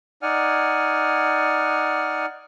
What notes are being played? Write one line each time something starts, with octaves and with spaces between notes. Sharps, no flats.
D#4 D5 F#5 G#5 F6